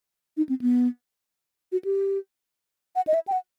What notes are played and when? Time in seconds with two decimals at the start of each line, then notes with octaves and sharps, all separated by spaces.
0.37 D#4
0.49 C4
0.61 B3
1.72 F#4
1.85 G4
2.96 F#5
3.07 D#5
3.14 E5
3.28 G5
3.32 F#5